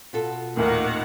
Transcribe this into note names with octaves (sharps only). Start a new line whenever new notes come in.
B2 F4 A4
D#1 D#2 A2 D#3 A#3 F#5